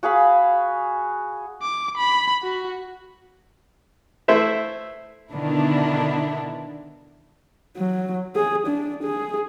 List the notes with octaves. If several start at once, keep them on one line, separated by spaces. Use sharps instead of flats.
F#4 G#4 F5 B5
D6
B5
F#4
A3 E4 C5 E5
B2 D3 D#3 B3 D4 E4
F#3
G#4
D4
G#4